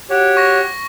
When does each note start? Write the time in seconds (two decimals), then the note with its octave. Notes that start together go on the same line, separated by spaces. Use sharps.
0.10 F#4 G4 C#5
0.37 C#6 A#6